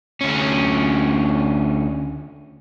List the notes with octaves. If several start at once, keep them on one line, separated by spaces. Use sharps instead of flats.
D2 C#4